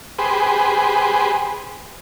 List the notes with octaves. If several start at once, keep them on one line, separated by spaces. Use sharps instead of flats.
G4 G#4 B4 C5